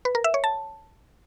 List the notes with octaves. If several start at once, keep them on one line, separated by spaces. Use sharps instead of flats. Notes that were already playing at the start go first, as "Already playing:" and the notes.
B4
A#4
E5
C#5
A5